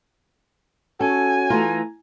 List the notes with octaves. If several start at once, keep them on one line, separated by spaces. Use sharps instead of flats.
C#4 F#4 A4 G#5
E3 A3 F4 A#5